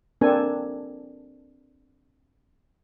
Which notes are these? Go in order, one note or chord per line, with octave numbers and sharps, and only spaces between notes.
A#3 C4 D4 A4 G#5